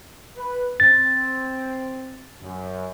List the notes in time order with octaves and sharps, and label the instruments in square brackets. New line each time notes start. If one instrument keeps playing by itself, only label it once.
[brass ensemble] B4
[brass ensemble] C4 [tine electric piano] A6
[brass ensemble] F#2